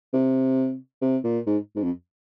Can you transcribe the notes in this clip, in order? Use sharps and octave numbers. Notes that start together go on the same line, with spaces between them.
C3
C3
A#2
G#2
G#2
F2